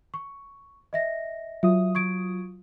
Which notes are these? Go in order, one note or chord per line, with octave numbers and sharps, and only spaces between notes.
C#6
D#5 E5 A#6
F#3 F4 E5 D#6
C#6 G#6 D7